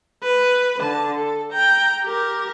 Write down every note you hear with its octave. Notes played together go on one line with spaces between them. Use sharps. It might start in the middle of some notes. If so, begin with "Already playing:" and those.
B4
D3 A5
A4
G5 A#5
G4 A#4